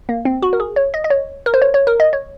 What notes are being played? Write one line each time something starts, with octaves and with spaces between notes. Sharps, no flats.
A#3
C4
F#4
A#4
G#4
C#5
D#5
D#5
C#5
A#4
C5
C#5
C#5
A#4
D#5
C#5